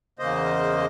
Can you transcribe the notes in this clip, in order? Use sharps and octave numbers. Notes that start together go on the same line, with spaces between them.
E2 C#3 A#3 C5 D#5